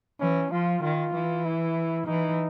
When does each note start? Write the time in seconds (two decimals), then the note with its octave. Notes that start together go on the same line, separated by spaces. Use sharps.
0.20 E3 C#4
0.52 F3 F4
0.82 D#3 F4
1.14 E3
1.45 E4
2.06 E3 D#4